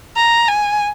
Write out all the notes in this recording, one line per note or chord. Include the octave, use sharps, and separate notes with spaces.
A#5
G#5